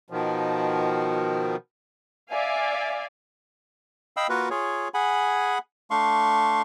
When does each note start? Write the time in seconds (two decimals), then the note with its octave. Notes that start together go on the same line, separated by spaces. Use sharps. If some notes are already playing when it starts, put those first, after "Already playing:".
0.10 B2 D#3 F3
2.29 D5 E5 F5 G#5
4.17 D#5 F5 G5 B5 E6
4.29 A#3 F4 F#4 A#4 B4
4.50 F4 G#4 C#5
4.94 G#4 F#5 G#5 B5
5.91 A3 D4 F5 C6 C#6